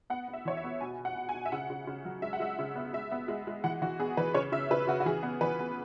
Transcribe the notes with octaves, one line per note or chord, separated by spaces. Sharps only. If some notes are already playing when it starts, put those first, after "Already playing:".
B3 F#5
B3
E5
E3 C#5
E5
B3
B2 G#5
B2
F#5
B2
G#5
B2
E5
C#3 F#5
C#3
C#3
F#3
G#3 E5
F#5
G#3 E5
C#3
B3
G#3 E5
B3
G#3
G#3
E3 F#5
E3 F#4
B3 G#4
E3 B4
C#3 C#5
C#3 E5
C#3 B4
C#3 F#4
F#4
E3 G#4
B3
E3 B4
B3